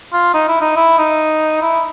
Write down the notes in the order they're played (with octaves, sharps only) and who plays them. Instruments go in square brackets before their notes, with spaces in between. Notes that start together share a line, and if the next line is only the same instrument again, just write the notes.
[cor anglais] F4
D#4
E4
D#4
E4
D#4
E4